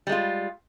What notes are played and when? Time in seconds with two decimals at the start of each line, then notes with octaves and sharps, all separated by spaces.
0.07 G3
0.09 G#3
0.12 F4